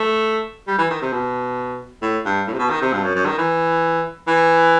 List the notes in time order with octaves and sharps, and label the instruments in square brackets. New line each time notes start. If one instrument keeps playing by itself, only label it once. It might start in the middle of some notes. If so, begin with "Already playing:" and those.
Already playing: [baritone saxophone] A3
G3
E3
D#3
C3
B2
A2
G2
A2
C3
B2
D#3
C3
G2
F#2
F#2
D#3
E3
E3